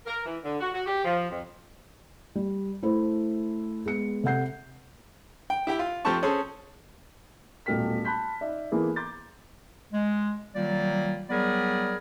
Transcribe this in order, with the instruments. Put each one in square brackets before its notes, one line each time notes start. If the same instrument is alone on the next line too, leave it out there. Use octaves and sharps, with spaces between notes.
[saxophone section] A#4
E3
D3
F#4
F#4
G4
F3
F2
[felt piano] G3
A3 E4 C5
G#3 B3 C#7
C3 A4 F#5 G6 C7
[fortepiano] G5
E4 G4 G5
F4
F3 C4 G4 A4 A5 C#6
C#4 G#4 A4 C5
[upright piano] D#1 B1 A3 G5 F6 B6
A5 B5 C6 F#6 G6 B6
D#4 D5 E5
E3 A#3 B3 E4 G#4 A4
A#5 C6 D6 G6 A6
[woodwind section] G#3
D#3 F#3 G3 A#3 F4 D5
F#3 G3 B3 G#4 A#4 D5